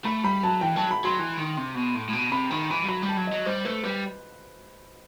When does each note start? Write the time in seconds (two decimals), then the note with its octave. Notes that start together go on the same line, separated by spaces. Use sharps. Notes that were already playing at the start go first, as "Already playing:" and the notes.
0.05 A3 B5
0.24 G3 B5
0.43 F#3 A5
0.61 E3 G5
0.76 F#3 A5
0.91 B5
1.04 F#3 C6
1.19 E3
1.37 D#3
1.57 C3
1.75 B2
1.95 A2
2.08 A2
2.13 B2
2.32 C3 B5
2.51 D#3 B5
2.71 E3 B5
2.84 G3
2.88 F#3 B5
3.03 G3
3.08 A5
3.17 F#3
3.27 F#3 D#5
3.46 G3 C5
3.65 A3 B4
3.83 G3 B4